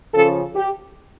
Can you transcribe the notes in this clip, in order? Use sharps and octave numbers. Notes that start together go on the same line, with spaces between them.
C#3 F3 C#4 A4
G4